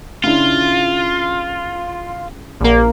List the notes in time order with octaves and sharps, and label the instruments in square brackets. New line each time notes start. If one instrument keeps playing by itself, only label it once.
[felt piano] C#3 D4 E4 [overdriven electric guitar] F4
[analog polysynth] A#1 A#3